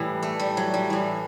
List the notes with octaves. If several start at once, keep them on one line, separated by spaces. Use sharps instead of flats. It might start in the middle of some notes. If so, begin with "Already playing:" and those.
Already playing: A2 E3 G3
A3
G3
F#3
G3
A2 E3